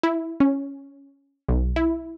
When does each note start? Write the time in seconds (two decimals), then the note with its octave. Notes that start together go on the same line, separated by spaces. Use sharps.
0.03 E4
0.40 C#4
1.49 B1
1.76 E4